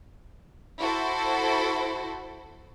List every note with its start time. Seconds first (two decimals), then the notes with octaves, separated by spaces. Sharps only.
0.79 E4 F#4 A4 C5